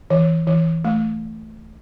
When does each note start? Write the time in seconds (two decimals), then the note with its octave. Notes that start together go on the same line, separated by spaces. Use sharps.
0.10 E3
0.47 E3
0.85 A3